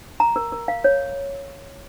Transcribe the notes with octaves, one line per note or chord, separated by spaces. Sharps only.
A#5
A#4
A#4
F5
C#5